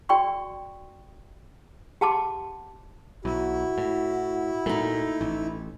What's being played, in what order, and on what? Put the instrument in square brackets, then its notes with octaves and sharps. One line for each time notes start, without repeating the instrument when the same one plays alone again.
[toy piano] F#4 D5 G5 C6 C#6
G4 F#5 A5 C6 D6
[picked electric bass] B1 [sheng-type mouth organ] E4 [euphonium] F#4
[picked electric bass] A2
[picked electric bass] A#2 [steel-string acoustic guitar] A3 D#4
[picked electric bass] A1